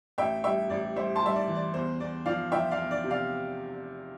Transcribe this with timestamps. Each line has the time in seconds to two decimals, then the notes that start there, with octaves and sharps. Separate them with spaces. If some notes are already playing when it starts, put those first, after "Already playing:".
0.18 A1 E5 G5
0.44 G3 E5 G5
0.70 A1 D5
0.96 G3 C5 E5
1.16 A5 C6
1.22 G3 E5
1.35 D5
1.48 E3
1.55 D5
1.74 E2 C5
2.00 E2 D5
2.26 F3 D5 F5
2.52 F3 E5 G5
2.71 D5 F5
2.78 E2
2.91 D5
3.04 C3
3.10 D5 F5